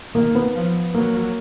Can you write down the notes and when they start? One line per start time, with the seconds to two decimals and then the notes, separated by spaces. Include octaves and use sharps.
0.15 D#3 A#3
0.35 B3
0.55 F3
0.94 F#3 A#3